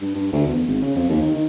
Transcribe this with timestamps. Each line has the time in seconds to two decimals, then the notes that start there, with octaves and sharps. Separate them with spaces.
0.01 G2
0.16 G2
0.32 D2
0.47 E2
0.67 G#1
0.82 C#3
0.96 F2
1.09 D#2
1.22 D#3
1.35 D#3